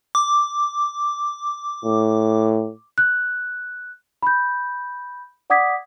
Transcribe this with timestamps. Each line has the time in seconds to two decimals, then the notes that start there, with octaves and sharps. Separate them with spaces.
0.15 D6
1.85 A2
2.98 F#6
4.23 B5 G6
5.50 D5 F#5 D6 D#6 G#6 B6